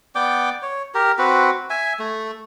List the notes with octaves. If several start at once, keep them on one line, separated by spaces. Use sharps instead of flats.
B3 D5 G5 D6
C#5
G4 A#4
C4 F#4 B4
E5 G#5
A3